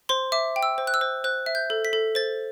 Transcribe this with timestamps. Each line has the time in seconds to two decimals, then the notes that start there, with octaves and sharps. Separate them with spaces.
0.09 C5 C6
0.32 E5 D6
0.56 G5
0.63 E6
0.78 C5
0.87 F#6
0.94 E6
1.01 C5
1.24 C5 F#6
1.46 E5
1.55 G6
1.70 A4
1.85 B6
1.93 A4
2.15 C5 A6